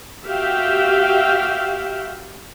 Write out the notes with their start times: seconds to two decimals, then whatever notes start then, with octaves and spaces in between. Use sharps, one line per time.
0.25 F#4 G4 E5 F5 G5